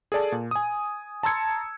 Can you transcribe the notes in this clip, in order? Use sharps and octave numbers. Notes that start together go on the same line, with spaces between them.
G#4 A4 D5 A5
A#2
G#5 D#6
A5 A#5 C6 E6 G#6 C#7